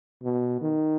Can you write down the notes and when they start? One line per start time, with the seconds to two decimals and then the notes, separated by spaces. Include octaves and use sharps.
0.23 B2
0.61 D#3